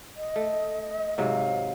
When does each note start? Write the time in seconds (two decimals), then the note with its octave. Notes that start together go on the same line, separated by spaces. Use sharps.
0.17 D#5
0.36 A3
1.18 G#2 C3 F#3 F5